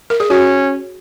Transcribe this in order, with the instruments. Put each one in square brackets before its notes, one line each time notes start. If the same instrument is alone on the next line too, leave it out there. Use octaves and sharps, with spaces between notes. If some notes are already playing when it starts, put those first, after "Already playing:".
[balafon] A#4
G#4
[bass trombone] C#4 [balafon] F#4